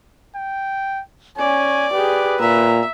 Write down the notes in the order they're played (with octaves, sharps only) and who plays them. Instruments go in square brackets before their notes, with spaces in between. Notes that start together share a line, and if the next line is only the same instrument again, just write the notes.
[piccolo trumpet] G5
[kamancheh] C#4 [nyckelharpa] D5 [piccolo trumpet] G#5
[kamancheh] G4 G#4 [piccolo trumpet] B4
[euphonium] A#2 [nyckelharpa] E5 [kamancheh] A#5